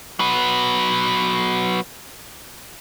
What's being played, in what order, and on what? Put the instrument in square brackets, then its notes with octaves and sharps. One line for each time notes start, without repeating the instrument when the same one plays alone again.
[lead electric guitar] F#3 B3